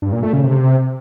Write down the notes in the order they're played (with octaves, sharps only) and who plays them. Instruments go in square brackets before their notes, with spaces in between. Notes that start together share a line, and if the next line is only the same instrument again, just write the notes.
[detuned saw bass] G2
A#2
A3
C#3
C3